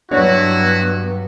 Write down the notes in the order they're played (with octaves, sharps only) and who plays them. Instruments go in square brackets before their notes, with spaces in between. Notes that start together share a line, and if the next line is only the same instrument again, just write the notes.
[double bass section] G2 F#3 B3 [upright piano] D4 C#5 [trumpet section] E4 F#4